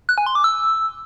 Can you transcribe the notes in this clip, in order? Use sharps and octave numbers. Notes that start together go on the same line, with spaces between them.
F#6
G#5
C6
D6
E6